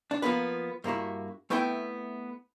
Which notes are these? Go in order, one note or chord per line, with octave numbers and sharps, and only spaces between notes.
D4
F3 A#3 B3 B4
G2 A#3 E4 F#4
A3 B3 C4 E4 G5